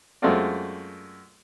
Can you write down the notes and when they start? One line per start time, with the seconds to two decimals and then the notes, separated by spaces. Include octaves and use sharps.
0.22 F#2 G#3 A3 C4 F4 D5